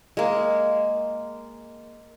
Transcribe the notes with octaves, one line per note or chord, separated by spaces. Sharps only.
G#3 A#3